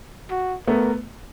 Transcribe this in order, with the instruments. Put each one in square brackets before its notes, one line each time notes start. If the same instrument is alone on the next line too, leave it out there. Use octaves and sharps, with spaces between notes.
[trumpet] F#4
[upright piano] A3 B3 [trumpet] A#4